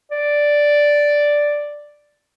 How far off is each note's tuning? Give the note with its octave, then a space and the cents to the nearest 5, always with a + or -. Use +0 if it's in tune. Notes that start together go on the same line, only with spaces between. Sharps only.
D5 +0